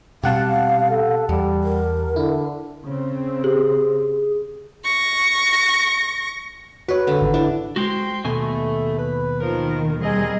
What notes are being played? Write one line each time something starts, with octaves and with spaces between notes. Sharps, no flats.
B2 G3 C4 G4 F5 F#5 A5
A4
E2 G3
A#4
D3 E4
C#3 C4
G4 G#4
C#6 A#6
F#4 B4 C#5
D3
G#1
D4 E4
G#3 C4 F#4 G5 C6
D#2 B2 A3 G#5
B4
D#3 F3 A#4
G3 C4 G#4 A#4 D#5